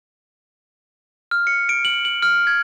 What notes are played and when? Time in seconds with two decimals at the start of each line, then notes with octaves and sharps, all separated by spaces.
1.31 F6
1.47 C#7
1.69 D7
1.85 F#7
2.05 F#7
2.23 F6
2.47 G#6